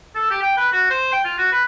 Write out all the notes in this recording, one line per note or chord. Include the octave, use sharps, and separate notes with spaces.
A4
G4
G5
B4
F#4
C5
G5
F4
F#4
B4